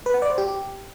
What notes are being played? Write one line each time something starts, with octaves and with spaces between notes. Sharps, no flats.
B4
F#5
D5
C5
G4